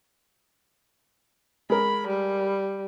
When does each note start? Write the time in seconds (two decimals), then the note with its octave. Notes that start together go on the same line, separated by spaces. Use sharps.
1.70 G#3 A#4 B5
2.07 G3